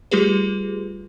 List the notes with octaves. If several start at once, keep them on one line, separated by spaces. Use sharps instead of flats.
G3 A3 F4 G4 G#4 B4